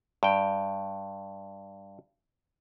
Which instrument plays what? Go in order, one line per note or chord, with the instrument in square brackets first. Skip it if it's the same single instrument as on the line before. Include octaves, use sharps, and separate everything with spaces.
[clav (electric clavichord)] G2 G5